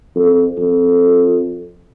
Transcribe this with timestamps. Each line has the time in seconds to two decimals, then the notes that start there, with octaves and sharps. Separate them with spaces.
0.16 F2
0.58 F2